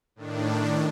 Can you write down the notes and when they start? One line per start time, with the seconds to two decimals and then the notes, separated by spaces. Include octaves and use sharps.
0.16 A2 D#3 D4